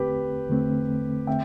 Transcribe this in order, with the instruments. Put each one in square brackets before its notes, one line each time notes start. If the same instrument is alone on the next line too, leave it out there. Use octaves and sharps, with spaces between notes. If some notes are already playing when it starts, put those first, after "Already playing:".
Already playing: [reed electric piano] E2 D3 A3 C4 [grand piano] G4 B4
[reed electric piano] E2 D3 A3 C4
[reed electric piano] D3 A3 C4 [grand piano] E5 G5